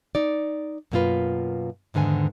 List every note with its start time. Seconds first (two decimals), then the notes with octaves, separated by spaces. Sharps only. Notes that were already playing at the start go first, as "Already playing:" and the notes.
0.15 D#4 D5
0.92 F#2 B2 A#3 D#4 F4 B4
1.94 E2 G#2 D3 D#3 G#5